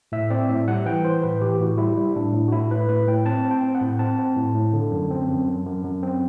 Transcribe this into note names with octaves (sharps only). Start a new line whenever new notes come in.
A2 E5
C4 D5
A2 E5
G3 F#5
E3 G5
E3 C5
A2 B4
E3 G4
A2 F#4
G3 E4
G3
A2 D4
A2
F#4
A2 E4
A2 B4
A2 B4
A2 G5
C4 A5
C4
G5
C4
F#5
A2
C4 A5
C4
A2
A2
D3
F#2
C4
F#2
F#2
F#2
F#2
C4